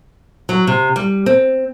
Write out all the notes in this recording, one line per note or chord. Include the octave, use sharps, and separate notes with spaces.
F#3
C3
G3
C4